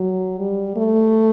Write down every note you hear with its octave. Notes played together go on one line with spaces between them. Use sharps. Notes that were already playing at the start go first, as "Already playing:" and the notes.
Already playing: F#3
G3
A3